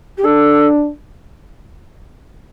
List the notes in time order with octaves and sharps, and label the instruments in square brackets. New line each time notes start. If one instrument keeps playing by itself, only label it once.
[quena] G4
[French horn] D4 [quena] A4